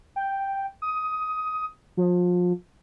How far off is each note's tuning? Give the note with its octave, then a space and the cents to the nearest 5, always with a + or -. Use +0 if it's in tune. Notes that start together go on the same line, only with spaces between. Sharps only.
G5 +0
D#6 +15
F3 +30